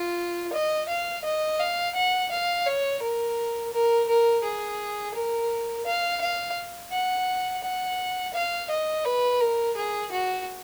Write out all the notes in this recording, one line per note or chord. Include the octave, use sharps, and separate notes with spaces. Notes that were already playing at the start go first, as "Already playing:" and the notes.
Already playing: F4
D#5
F5
D#5
F5
F#5
F5
C#5
A#4
A#4
A#4
G#4
A#4
F5
F5
F#5
F#5
F5
D#5
B4
A#4
G#4
F#4